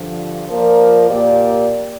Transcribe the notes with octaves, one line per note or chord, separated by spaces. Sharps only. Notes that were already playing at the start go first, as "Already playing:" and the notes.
Already playing: G2 D3 F3
F3 A#3 F4 A#4 D5
A#2 A#3 G4 D5